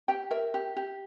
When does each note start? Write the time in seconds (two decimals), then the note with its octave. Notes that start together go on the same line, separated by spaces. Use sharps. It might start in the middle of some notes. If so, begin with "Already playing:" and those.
0.08 G4 G5
0.31 A#4 E5
0.54 G4
0.76 G4